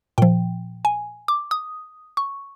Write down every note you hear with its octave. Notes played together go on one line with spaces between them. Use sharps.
A#2 F3 G5
G#5
D6
D#6
C#6